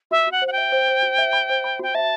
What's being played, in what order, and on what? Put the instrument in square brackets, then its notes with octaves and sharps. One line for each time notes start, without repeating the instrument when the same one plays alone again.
[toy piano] F#4 [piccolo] E5
[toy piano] F#4 [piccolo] F#5
[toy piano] C5
[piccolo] F#5
G5
[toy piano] E5
C5
C5
F#4
E5
B5
C5
B5
[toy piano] F#4 [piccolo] G5
[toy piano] E5 [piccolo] A5